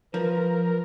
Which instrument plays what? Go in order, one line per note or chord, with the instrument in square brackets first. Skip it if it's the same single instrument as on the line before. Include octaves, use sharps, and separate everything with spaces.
[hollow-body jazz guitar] F3 [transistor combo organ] A#4 [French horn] B4